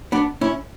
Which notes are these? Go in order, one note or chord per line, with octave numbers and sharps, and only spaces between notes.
B3 D4
C#4 E4